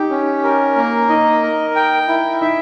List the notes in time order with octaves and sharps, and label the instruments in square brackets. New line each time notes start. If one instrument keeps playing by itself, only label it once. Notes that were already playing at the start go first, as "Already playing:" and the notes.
Already playing: [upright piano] D#4 [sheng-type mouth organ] G4
[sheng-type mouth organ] C#4
A#4
A#3
[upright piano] D#4 [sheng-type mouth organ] D#5
[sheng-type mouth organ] A#4
G5
E4
[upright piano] D#4 [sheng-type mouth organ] E5